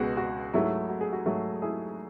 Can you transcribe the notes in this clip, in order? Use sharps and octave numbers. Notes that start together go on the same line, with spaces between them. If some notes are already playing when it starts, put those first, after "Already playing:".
Already playing: C#2 B2 G#3 B3 F#4
F#4
G#2 F#3 A3 E4
F#4
G#4
F#4
G#2 F#3 A3
E4 G#4